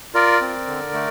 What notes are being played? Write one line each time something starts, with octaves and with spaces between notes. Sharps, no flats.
F4 A#4 D5
C4
D3
A3